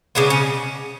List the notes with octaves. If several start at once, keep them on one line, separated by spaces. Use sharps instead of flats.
C#3 G#3 B3 D4
C#4